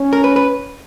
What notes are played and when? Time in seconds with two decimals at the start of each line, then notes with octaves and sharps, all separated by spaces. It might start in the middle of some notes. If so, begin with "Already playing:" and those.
Already playing: C#4
0.13 A#4
0.24 B4
0.36 B4